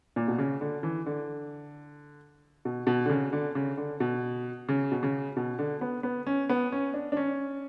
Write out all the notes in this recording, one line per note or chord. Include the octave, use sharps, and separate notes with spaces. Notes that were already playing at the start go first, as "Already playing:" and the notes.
A#2
B2
C#3
D3
E3
D3
B2
B2
D3
C#3
D3
C#3
D3
B2
C#3
B2
C#3
B2
D3
B3
B3
C#4
B3
C#4
D4
D4
C#4